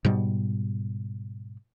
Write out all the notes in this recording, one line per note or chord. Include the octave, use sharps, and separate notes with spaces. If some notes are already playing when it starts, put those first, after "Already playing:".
G#2 B2 G3